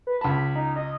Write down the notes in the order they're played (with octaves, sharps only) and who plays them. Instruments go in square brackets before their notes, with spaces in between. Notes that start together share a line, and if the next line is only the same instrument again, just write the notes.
[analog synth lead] B4
[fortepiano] C#2 A5 [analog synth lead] B5
[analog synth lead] D#4
D#5